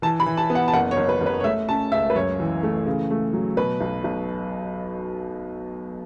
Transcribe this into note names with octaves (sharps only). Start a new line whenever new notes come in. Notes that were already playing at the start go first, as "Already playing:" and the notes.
E3 A5
B5
E3
A5
B3
F#5
A5
F#1 F#5
C#5
F#1
B4
F#1
B4
C#5
A3 E5
C#4 A5
C#2 E5
B4
F#2 C#5
E3
A3
C#3
A3
F#3
B2 B4
B1
B1